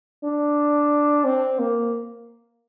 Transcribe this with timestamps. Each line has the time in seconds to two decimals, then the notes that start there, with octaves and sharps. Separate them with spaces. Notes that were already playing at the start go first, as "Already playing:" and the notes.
0.25 D4
1.25 C4
1.59 A#3